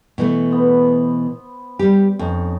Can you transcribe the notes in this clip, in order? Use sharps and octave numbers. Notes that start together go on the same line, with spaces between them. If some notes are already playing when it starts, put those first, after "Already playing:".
B2 E3 A3
B3 C5
G3 G4
F2 C#4 D#4